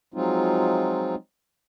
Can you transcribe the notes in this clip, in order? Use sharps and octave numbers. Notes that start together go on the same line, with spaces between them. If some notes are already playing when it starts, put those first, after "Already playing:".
F3 F#3 G#3 C4 D#4 F4